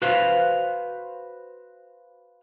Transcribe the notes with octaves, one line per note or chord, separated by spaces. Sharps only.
F#4 B4 C5 F5